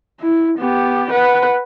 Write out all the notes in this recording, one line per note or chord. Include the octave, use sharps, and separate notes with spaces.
E4
B3 G4
B4 F#5